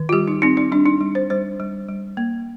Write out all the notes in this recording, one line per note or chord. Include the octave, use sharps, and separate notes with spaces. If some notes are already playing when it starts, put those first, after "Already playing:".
Already playing: D#3
F4
G3 G4
D#4
C4 D#4
D#4
G3 D4
D#4
G3
C5
G3 C5
G3
G3
A#3